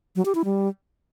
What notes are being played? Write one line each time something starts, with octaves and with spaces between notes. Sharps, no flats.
F#3
G4
E4
G3